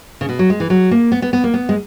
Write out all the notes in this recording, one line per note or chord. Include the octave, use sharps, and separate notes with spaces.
C#3
B2
F#3
G#3
E3
F#3
A#3
B3
B3
B3
A#3
B3
G#3